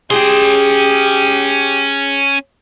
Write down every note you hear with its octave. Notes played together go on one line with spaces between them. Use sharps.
C#4 G4 G#4 C6